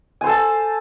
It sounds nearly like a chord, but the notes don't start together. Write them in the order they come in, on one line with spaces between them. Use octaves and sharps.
G#5 C5 A4 A5